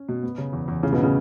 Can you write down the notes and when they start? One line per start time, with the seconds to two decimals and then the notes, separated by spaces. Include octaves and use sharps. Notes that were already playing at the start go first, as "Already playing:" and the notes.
Already playing: C#4
0.09 B2
0.23 B3
0.38 C#3
0.53 E2
0.68 E2
0.83 A2 C#3
0.93 B2
0.98 A2
1.03 C#3